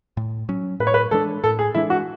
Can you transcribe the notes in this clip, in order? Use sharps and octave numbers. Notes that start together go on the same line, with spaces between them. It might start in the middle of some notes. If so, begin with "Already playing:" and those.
A2
F#3 C#4
A2 B4
C#5
B4
E3 G#3 D4 A4
A2 A4
G#4
E3 G#3 D4 E4
F#4